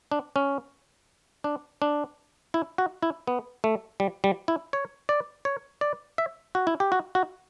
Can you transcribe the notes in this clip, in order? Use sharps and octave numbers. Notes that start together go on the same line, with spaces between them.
D4
C#4
D4
D4
E4
F#4
E4
B3
A3
G3
G3
E4
C#5
D5
C#5
D5
E5
F#4
E4
G4
F#4
F#4